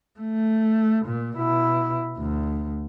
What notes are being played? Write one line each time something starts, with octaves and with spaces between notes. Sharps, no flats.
A3
A#2
B2 E4
D2